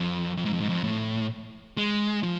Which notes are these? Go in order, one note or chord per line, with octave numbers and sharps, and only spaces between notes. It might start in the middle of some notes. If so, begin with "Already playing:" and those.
Already playing: F2
F2
G#2
F2
G#2
F2
A2
G#3
F3